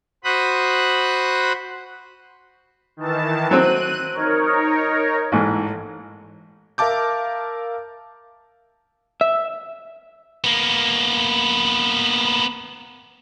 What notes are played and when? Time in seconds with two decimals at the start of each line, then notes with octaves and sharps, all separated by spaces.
0.24 F#4 C5 B5 D#6 F#6
2.97 D#3 E3 A5
3.51 F#3 C4 F#6 D#7
4.14 D#4 A#4 C#5
5.32 A1 G#2
6.78 A#4 E5 F5 A5 D6 G6
9.21 E5
10.44 A#3 B3